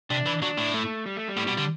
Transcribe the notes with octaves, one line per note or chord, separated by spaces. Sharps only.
C3 D4
E3
F#3 D4
A2
A3
G3
A3
G3
A2
B2
D3